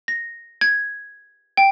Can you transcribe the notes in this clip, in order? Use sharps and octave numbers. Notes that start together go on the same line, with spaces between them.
A#6
G#6
G5